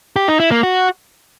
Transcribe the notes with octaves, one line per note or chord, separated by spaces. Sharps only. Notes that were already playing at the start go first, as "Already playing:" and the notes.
G4
D#4
E4
A#3
F#4